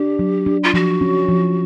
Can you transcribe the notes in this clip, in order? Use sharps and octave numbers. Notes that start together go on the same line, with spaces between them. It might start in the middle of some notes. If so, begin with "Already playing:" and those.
Already playing: D4 G4
F#3
D4
F4
F3 F#4
C#4
F3